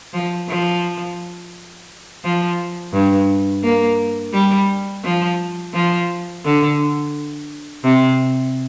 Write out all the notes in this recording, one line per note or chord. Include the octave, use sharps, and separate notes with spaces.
F3
F3
F3
G2
A#3
G3
F3
F3
D3
C3